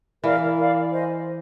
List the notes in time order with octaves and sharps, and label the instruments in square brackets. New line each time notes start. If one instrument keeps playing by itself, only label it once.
[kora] E3 [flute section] A#4 D5 F5
[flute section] A#4 D5 F5
C5 D#5 G#5